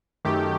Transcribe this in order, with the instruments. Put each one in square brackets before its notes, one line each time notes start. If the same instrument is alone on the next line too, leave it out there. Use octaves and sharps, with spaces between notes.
[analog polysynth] F#2 D#3 A3 G4